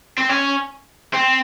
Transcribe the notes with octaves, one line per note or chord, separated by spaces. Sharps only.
C4
C#4
C4